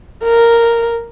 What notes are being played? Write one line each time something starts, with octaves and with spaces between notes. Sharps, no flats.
A#4